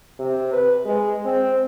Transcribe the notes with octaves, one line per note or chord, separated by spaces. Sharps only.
C3
B4
G#3
C4